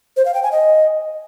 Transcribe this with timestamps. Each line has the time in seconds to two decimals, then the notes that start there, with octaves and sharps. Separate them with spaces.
0.17 C5
0.25 F5
0.34 G5
0.43 G#5
0.52 D#5